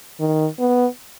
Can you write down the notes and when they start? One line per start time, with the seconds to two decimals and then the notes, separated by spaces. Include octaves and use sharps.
0.20 D#3
0.59 B3